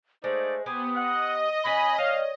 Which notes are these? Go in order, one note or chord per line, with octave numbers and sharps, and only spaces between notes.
G#3 A3 D#4 C5 D5
B3 G4 B4 C5 G#5 D#6
D#5 F#5
E3 C#4 G#5 B5
G3 C#5 F5